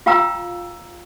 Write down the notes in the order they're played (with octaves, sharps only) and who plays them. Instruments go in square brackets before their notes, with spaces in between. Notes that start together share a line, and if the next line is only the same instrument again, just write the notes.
[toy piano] F4 F5 G5 A#5 E6